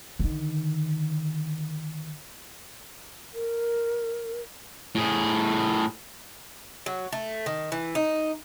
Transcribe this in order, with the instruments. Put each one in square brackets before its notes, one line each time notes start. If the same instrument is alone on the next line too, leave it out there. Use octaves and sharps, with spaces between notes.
[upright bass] D3 D#3
[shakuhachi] A#4
[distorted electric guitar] A2 G#4
[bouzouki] F#3
A3
D#3
E3
D#4